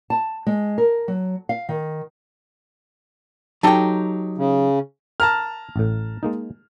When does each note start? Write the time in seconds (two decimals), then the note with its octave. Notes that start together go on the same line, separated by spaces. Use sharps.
0.10 A5
0.47 G#3
0.78 A#4
1.08 F#3
1.49 F5
1.69 D#3
3.63 F#3 D#4 G4 A4 G5
4.38 C#3
5.20 A#4 A5 A#5 F6
5.76 A1 A2
6.23 G#3 A#3 D#4